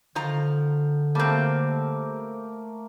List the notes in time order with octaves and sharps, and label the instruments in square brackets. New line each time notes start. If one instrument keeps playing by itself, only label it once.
[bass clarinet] D3 [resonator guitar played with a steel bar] D#3 F3 A#5
[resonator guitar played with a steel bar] G3 C4 [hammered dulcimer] A3 A#3 A#4